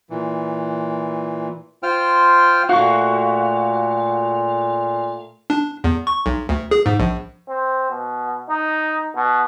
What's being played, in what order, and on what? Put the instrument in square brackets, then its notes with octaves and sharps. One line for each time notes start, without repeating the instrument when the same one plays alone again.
[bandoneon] A#2 E3
F4 C5 G5 F6
[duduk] A#2 [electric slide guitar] A3 F5 [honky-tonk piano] F#4 C#6
[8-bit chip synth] D4
E2
C#6
B1
D2
G#4
G#2
A#1
[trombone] C4
B2
D#4
B2